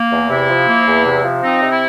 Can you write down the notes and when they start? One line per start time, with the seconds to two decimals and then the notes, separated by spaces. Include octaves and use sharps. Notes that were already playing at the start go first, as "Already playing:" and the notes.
Already playing: A#3
0.11 E2
0.30 C3 E4
0.49 F3
0.67 A#3
0.86 E2
1.05 C3
1.24 F3
1.42 C4 D#4
1.62 C3
1.71 E4